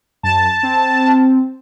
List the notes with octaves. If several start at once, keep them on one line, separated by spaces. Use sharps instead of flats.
F#2 A5
C4